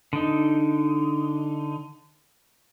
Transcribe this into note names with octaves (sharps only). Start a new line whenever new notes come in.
D3 D#4